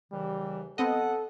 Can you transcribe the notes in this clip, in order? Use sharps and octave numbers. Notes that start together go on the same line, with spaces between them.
D#2 C#3 E3 G3
B3 C4 A4 D#5 F#5